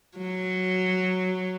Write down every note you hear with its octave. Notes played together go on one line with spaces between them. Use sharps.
F#3